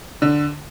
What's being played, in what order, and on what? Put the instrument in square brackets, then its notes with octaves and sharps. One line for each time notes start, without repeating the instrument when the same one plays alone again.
[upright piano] D3